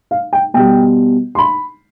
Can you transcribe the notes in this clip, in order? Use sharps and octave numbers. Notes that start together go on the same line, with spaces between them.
F5
G5
B2 G3 G5
C6
B5